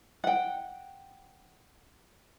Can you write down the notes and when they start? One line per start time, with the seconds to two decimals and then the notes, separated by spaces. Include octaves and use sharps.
0.24 F#5 G5